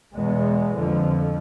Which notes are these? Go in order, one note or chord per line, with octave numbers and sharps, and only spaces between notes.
E2 B2 G#3 B3
F2 D3 F3